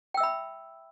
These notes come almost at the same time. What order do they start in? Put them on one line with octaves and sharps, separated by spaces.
G5 E6 E5 B5